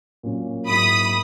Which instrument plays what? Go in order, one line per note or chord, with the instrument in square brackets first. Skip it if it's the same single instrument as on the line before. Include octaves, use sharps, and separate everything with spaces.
[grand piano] A#2 F#3 C#4
[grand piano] G#2 F#3 A#3 E4 [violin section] B5 D#6